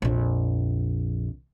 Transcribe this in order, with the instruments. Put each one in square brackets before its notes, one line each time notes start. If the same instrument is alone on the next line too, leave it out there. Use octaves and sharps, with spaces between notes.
[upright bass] A#1 F2